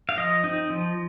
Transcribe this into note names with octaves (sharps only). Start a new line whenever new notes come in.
F5
F3 D#5
C4 D#4
F3